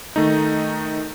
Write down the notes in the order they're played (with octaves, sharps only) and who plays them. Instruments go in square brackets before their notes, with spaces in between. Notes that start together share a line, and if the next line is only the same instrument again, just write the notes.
[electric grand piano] D#3 A3 D#4